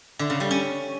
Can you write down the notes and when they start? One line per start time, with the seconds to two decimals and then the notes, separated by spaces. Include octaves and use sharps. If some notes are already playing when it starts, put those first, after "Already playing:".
0.19 D3
0.30 C#3
0.40 G3
0.51 C#4